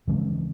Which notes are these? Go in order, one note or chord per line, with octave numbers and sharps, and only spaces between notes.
C#3 E3 G#3 C4